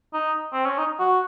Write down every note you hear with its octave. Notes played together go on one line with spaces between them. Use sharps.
D#4
C4
C#4
D#4
F#4